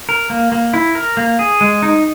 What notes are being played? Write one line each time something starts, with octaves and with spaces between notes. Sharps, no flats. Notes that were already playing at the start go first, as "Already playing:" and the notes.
A#4
A#3
A#3
E4
A#4
A#3
G#4
G#3
D#4